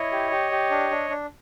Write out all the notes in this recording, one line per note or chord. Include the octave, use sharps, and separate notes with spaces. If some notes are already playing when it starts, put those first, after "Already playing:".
Already playing: E4 C#5 D#5
G4
G4
G4
D4
D4
D4